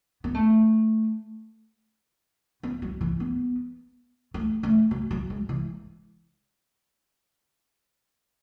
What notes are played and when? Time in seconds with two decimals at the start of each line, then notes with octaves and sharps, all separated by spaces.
0.24 B3
0.34 A3
2.63 B3
2.82 F#3
3.01 E3
3.20 B3
4.34 A3
4.63 A3
4.91 F#3
5.11 F#3
5.30 G#3
5.49 E3